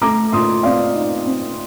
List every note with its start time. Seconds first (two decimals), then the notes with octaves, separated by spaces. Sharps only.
0.02 A3 A#5 D6
0.32 A#2 C6 D#6
0.63 C4 D5 F5
0.95 D#4
1.26 C4